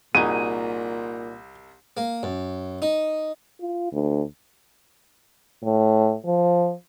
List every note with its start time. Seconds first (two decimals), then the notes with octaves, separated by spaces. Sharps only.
0.15 C2 A#2 D#4 F#4 G#4 D#7
1.97 A#3
2.23 F#2
2.82 D#4
3.61 F4
3.93 D2
5.63 A2
6.25 F3